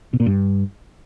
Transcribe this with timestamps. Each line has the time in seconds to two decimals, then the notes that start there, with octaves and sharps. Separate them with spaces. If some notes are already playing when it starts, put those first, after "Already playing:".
0.13 B2
0.20 A#2
0.26 G2